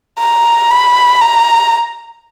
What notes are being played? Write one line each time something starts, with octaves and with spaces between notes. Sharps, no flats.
A#5
B5
A#5